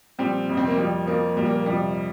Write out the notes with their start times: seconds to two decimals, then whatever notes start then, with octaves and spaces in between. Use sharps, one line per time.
0.18 A#2 F3 G3 C4
0.48 F2 C3 F3
0.57 C4
0.67 A#3
0.77 F2 F3 G3
1.07 F2 F3 A#3
1.36 A#2 F3 G3
1.46 A#3
1.56 A#3
1.66 F2 C3 F3 G3